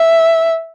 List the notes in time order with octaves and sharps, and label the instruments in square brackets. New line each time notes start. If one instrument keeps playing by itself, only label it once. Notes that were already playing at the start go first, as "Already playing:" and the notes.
Already playing: [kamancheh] E5